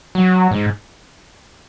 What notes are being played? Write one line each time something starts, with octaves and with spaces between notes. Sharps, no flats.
F#3
G#2